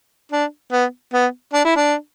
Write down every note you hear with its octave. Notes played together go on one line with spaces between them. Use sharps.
D4
B3
B3
D4
E4
D4